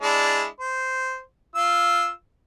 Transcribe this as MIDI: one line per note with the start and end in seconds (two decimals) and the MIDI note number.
0.02 0.45 56
0.02 0.45 62
0.02 0.45 64
0.60 1.20 72
1.55 2.09 65
1.55 2.09 88